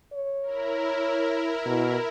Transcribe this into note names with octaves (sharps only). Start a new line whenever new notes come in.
C#5
E4 A#4
B2